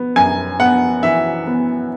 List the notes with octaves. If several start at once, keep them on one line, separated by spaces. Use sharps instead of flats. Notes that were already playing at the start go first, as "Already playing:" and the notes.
Already playing: B3
F#2 G#5
B3 F#5
E3 E5
B3